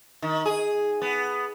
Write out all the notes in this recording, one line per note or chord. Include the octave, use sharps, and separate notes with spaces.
D#3
G#4
B3